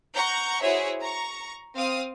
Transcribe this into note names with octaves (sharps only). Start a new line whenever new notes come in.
F#5 A#5 C#6 G6
E4 F#4 G#4 C5 C#5 E5
A#5 C#6
C4 F5 D#6